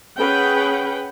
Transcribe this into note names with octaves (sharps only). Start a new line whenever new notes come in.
C#4 G#4 B4 F#5 G5